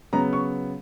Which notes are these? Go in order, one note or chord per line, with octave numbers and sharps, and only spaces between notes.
C#3 F#3 B3 A#5
C#6